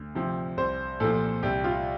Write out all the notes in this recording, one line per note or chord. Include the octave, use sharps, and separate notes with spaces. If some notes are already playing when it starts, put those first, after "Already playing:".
Already playing: D2
C3 F3
C2 C5
A#2 F3 A4
C2 G4
F4